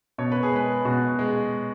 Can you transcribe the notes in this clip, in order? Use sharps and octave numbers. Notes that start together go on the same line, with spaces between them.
B2 C#5
B4
G#4
G#3 B4
B2 F#4
G#3